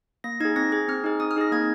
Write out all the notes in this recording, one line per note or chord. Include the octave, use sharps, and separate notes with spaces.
A#3 A#6
D#4 G#4 G#6
C4 A#6
G#4 G#6
C4 F6
D#4 G#4
C4 D#6
F6
D#4 G#4 A#6
A#3 G#6